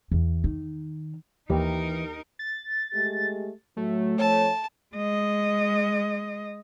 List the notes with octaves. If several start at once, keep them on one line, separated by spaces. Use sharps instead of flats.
E2
D#3
D#2 E3 D#4 G4 A#4
A6
G#3 A3 G4
A2 F#3 A3
F2 F3 C#5 A5
G#3 D#5